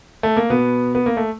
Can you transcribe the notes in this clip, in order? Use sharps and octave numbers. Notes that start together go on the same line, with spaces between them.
A3
A#3
B2 B3
B3
A#3
A3